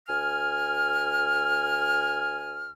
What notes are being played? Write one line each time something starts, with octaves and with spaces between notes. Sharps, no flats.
D2 G#5 F6